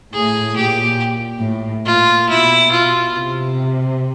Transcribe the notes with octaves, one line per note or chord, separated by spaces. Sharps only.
A2 G#4
A#2 G4
A2
A#2 F4
B2 E4
F4
C3